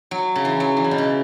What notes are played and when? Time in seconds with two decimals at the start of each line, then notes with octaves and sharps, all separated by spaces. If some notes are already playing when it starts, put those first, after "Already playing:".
0.11 F#3
0.36 C#3
0.45 E3
0.60 F#3
0.77 E3
0.84 C#3
0.91 B2
0.98 C#3